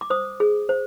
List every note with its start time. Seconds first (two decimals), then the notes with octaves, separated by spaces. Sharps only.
0.01 D6
0.10 C5 D#6
0.40 G#4
0.69 C5